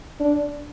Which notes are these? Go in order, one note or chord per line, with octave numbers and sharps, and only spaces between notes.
D4